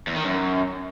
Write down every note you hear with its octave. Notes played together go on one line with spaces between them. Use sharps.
E2
D#3
F#2